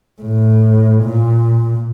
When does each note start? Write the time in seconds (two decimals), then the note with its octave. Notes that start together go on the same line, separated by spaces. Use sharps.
0.22 A2
1.04 A#2